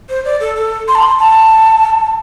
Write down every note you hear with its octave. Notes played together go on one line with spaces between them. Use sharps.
C5
D5
A4
A4
C6
A5
C6
A5